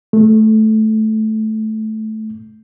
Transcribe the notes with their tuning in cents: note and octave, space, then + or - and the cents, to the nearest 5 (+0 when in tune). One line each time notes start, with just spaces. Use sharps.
A3 -15